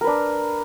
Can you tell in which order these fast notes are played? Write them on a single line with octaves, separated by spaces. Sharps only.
A#4 B4 D4